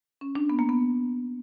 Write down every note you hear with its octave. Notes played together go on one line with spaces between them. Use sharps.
C#4
D4
B3
A#3
B3